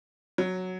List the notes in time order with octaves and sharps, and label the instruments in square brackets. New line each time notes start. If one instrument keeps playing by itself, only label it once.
[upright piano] F#3